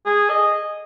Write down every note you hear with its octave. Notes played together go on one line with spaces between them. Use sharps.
G#4
D#5